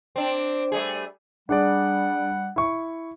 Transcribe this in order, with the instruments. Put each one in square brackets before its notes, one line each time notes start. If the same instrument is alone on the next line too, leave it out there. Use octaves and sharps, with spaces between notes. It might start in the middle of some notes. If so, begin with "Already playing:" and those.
[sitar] C4 D4
G3 A3 G#4
[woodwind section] G3 F#5 [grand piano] D4 G#4 D5
[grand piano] E4 C#6